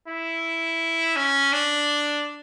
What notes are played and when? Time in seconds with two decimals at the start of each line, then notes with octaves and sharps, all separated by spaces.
0.08 E4
1.16 C#4
1.53 D4